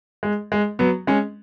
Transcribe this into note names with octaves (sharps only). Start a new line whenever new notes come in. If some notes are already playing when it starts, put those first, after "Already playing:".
G#3
G#3
F#3 B3
G#3 C#4